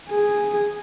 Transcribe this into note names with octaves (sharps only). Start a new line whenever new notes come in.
G#4